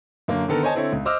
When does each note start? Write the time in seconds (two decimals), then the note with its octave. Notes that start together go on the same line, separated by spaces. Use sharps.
0.28 F#2 D3 A#3
0.48 D3 D#3 B3 A4 A#4
0.63 C5 C#5 D#5 G#5 A5
0.75 D3 C4 E4 A4 C#5
0.92 C#2
1.05 C5 D#5 D6 E6 F6